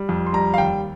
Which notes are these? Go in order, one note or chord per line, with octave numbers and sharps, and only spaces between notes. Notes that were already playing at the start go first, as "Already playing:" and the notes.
Already playing: G3
F2
C6
G3 A#5
F5
D#2 G5